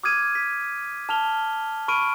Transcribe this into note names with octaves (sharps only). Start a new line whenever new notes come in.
D6 D#6 F6 G#6 D#7
B6
A5 F6 F7 G7
B5 C#6 F6 D7 D#7